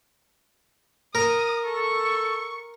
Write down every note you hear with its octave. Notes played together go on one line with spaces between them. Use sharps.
A#4 D#6
A4 C#6